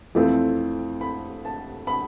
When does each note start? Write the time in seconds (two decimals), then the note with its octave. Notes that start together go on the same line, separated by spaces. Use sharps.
0.15 F2 E3 A3 C4 F4
1.01 B5
1.45 A5
1.87 B5